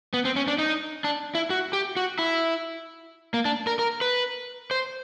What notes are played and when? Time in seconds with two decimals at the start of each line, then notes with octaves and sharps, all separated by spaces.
0.14 B3
0.25 C4
0.36 C#4
0.48 D4
0.58 D#4
1.04 D4
1.35 E4
1.50 F#4
1.73 G4
1.97 F#4
2.19 E4
3.34 A#3
3.45 D4
3.67 A#4
3.79 A#4
4.01 B4
4.71 C5